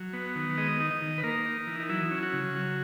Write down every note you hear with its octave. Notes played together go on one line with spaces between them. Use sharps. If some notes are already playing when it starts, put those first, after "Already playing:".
Already playing: F#3
B3
D#3
G#3 D#5
D#4
D#5
D#3
B4
A#3 A#4
D#4
E3
D#4
F#3 E4
C#4
F#4
C#3
F#3